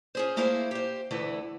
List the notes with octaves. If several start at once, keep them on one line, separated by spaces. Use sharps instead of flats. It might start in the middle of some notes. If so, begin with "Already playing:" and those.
C#4 G#4 C5
A3 A#3 E4 G#4 C5 F5
G4 C5
D2 D3 E3 A3 E4